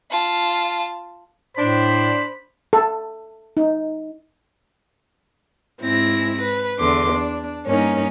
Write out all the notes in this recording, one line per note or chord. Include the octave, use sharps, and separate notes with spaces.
F4 A5
A2 D4 C5 B5
A4
D#4
G#2 C4 E4 A#6
B4
E2 D3 C6 D6
D4
G2 A#3 C#4 D#4